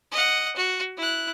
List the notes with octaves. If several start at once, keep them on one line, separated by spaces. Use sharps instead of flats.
D#5 F#5
F#4
E4 F#6